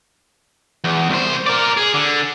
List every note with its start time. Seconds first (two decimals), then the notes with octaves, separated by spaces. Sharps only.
0.84 E2
1.09 C2 C5
1.46 A#4 D5
1.77 G#4
1.94 D3